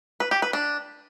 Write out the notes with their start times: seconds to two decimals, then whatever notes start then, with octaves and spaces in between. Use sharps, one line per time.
0.20 B4
0.31 G4
0.42 B4
0.53 D4